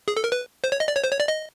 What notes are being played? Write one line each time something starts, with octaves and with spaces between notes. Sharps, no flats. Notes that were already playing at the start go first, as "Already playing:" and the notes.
G#4
A4
A#4
B4
C5
C#5
D#5
D5
C#5
C5
C#5
D5
D#5